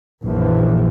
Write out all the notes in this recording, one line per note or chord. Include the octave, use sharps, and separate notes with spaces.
A#1 F#2 E3 F3